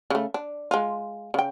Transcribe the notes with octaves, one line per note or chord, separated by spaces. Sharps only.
C#3 A3
D4
G#3 F4
C#3 G5